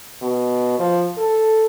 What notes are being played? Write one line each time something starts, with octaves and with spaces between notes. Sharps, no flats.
B2
F3
A4